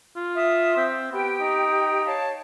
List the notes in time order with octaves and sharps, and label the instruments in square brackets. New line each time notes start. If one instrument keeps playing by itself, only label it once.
[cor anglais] F4
[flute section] E5 D#6
[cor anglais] C4
[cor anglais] B3 [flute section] G4 G5
[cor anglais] D#4
[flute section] C#5 F5 A5